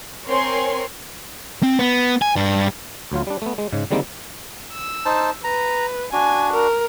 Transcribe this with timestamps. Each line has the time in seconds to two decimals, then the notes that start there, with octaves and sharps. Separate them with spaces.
0.25 C4 A#4 C#5 G#5 C6
1.63 C4
1.79 B3
2.22 G#5
2.36 G2 D4
3.12 D2 F#3 F4
3.27 G3 D4
3.42 A3 B3
3.58 G#3
3.72 G#2 C#3 G#3
3.91 D3 D#3 G3 G#3 A#3 C4
4.73 E6
5.06 D#4 C5 A5
5.44 B4 A#5
6.13 D4 F#4 G#5
6.53 A#4